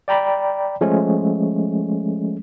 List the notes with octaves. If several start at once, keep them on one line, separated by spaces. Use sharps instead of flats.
D5 G5 A#5 B5
F3 G#3 A3 C#4